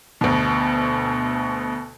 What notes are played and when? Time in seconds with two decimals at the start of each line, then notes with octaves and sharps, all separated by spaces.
0.21 D2 B2